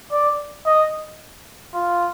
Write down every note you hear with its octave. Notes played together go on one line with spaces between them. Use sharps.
D5
D#5
F4